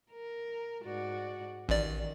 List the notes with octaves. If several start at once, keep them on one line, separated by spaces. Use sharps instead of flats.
A#4
G#2 F#4 D5
A1 D#3 D5